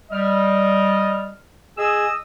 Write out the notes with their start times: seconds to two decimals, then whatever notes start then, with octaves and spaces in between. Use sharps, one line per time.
0.11 G3 D#5 F6
1.78 G#4 D#5 D#6 E6